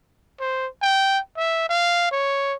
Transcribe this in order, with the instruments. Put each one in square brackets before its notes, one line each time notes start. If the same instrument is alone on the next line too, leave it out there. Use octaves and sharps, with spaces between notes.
[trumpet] C5
G5
E5
F5
C#5